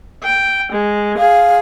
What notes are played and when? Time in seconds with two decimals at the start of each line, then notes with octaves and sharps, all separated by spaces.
0.23 G5
0.72 G#3
1.18 G#4 F5